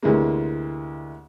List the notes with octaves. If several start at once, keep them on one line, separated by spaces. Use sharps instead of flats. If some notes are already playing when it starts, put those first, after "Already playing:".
D2 C3 E3 G#3 A#3